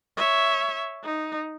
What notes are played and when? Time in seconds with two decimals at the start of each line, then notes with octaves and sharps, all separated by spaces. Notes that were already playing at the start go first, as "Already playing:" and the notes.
0.17 C#5 E5
1.04 D#4